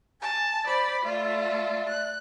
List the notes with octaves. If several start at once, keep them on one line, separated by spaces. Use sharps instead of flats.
G#5 A5
C5 D5 B5
A3 F4 D5 E5
F#6